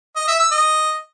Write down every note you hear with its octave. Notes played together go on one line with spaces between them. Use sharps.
D#5
E5
E6
D#5